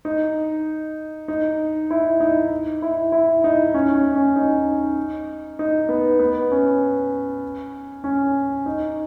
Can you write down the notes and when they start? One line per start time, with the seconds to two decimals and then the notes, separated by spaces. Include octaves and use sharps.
0.05 D#4
1.28 D#4
1.90 E4
2.20 D#4
2.82 E4
3.12 E4
3.44 D#4
3.74 C#4
3.95 C#4
4.15 C#4
4.36 D#4
5.59 D#4
5.89 B3
6.19 B3
6.51 C#4
8.04 C#4
8.66 D#4